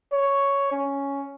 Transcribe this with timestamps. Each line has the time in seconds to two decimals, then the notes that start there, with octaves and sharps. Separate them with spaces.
0.12 C#5
0.72 C#4